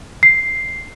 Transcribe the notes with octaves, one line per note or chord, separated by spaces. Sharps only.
C7